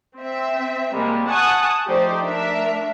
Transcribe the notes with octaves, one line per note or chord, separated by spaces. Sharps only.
C4 E5
C3 G3 G#3 A#3
F#5 G#5 A5 C#6 D#6 F#6
F3 A3 D#4 G4 C5 D5
A3 D4 A#4 E5